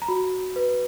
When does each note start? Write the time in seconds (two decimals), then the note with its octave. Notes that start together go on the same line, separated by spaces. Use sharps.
0.02 A#5
0.08 F#4 B5
0.56 B4